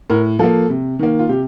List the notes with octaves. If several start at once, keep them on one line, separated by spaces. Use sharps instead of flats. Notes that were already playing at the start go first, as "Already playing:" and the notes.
A2 A#4
F3 A#3 A4
C3
D#3 A#3
F4
C3 G4